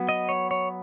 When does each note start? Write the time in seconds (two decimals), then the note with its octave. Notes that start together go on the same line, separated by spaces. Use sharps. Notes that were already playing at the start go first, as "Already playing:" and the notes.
Already playing: F#3 B3
0.09 D#5
0.29 C#5
0.51 C#5